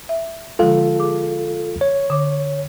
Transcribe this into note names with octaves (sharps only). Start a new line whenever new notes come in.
E5
D3 F3 G#3 F4 A4 F5
G#4 D6
C#5
D3 D6